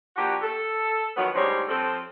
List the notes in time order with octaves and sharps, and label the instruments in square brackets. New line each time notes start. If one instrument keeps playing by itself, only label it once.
[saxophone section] F3 A#3 D4 F#4 G4
A4
D#3 F3 F#3 B3
D2 G#2 G3 G#3 C5 C#5
F3 C4 A4